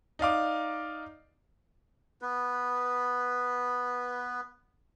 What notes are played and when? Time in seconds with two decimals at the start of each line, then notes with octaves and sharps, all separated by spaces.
0.19 D#4 D5 F5 D6
2.22 B3 B4